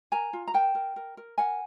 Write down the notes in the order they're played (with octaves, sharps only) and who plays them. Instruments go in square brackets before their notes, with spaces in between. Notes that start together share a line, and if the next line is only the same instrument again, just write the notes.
[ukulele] A#4 G#5 A#5
F4
A#5
A#4 G5 A5
A#4
A#4
A#4
A#4 F#5 G#5